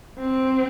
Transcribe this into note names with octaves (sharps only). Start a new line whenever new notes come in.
C4